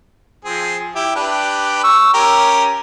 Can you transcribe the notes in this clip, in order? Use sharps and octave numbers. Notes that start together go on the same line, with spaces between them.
F3 C4 G#4
E4 G4
D4 G4 B4
C#6 E6
C#4 G4 A#4